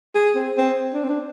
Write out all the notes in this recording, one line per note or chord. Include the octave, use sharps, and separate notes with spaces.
G#4
C4
C4
D4
C4
D4